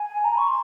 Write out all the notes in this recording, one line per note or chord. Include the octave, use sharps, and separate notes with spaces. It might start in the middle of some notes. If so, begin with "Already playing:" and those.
Already playing: G#5
A#5
C#6
C6